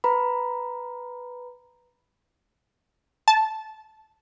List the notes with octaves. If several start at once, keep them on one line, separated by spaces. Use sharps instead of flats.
B4 A#5 B5
A5